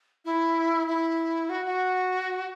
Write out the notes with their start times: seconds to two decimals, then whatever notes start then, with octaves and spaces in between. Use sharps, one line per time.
0.25 E4
0.87 E4
1.49 F#4
1.65 F#4